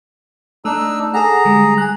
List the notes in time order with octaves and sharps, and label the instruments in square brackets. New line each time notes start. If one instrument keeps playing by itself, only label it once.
[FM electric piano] A3 F#6 [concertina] D4 D#4 E6
[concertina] G#4 A#5 [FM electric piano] A4 F#5
[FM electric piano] D3 G3 G#3
G#5 F#6